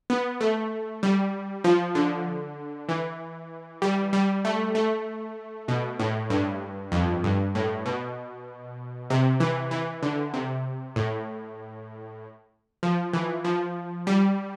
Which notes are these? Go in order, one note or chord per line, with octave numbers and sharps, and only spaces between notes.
B3
A3
G3
F3
D3
E3
G3
G3
A3
A3
B2
A2
G2
F2
G2
A2
B2
C3
E3
E3
D3
C3
A2
F3
E3
F3
G3